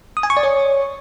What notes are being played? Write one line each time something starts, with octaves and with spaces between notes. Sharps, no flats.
D#6
G#5
C#6
D5
C#5